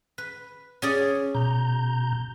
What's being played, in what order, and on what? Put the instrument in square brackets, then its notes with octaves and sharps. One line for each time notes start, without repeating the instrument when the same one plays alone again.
[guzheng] B4
C#4 G#4 D5
[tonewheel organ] B2 A#5 G6